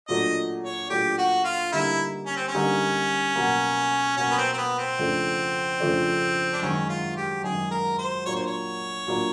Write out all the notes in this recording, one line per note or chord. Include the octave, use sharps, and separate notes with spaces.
A#2 F#3 A3 D4 D#5
C#5
A#2 F#3 A3 D4 G4
F#4
F4
D3 G3 A#3 D#4 E4
C#4
C4
C#4
D3 G3 A#3 D#4
B2 F#3 A#3
B2 F#3 A#3 C#4
B3
C4
C4
B3
C4
F2 C#3 F3 A3 D4
F2 C#3 F3 A3 D4
D4
F#2 D#3 G#3 C#4
F4
G4
F#2 D#3 G#3 G#4
A#4
C5
A#2 F#3 A#3 D4 C#5
C5
C#5
A#2 F#3 A#3 D4